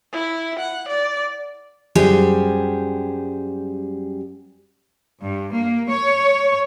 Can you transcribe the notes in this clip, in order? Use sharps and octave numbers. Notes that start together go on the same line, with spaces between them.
E4
F#5
D5
F#2 G3 G4 G#4 C5
G2
A#3
C#5